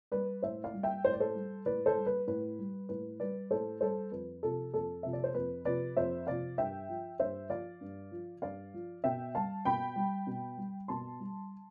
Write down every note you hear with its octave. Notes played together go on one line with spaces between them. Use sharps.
G3 B4 D5
A2 C5 E5
D5 F5
G3
E5 G5
A2 C5
D5
A4 C5
G3
A2 B4 D5
A4 C5
G3
B4
A2 B4
G3
A2 B4
G3 B4 D5
A2 A4 C5
G3 A4 C5
F2 B4
C3 F3 A4
F2 A4
C3 F3 E5
D5
C5
F2 B4
C3 F3 B4 D5
F2 C5 E5
C3 F3 D5 F5
G2 E5 G5
F3
G2 C5 E5
F3 D5 F5
G2
F3
G2 D5 F5
F3
B2 E5 G5
G3 F5 A5
B2 G5 B5
G3
B2
G3
B2 A5 C6
G3